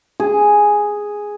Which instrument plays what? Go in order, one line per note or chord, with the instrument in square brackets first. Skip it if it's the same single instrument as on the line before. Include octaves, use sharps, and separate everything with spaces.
[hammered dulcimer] G#4